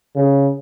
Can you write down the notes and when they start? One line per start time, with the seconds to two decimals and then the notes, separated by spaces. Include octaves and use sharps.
0.16 C#3